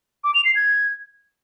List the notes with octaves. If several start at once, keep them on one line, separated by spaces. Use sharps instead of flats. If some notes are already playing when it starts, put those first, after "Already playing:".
D6
F7
C7
G#6